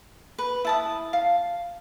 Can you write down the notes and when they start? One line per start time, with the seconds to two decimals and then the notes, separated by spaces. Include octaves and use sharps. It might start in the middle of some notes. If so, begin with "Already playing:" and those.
0.38 B4
0.65 E4 A5 D#6
1.13 F5